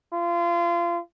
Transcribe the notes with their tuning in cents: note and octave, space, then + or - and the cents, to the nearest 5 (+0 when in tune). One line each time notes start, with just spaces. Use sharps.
F4 -30